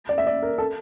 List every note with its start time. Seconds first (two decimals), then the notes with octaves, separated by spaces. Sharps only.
0.09 D5
0.18 E5
0.27 D5
0.43 A#4
0.58 A4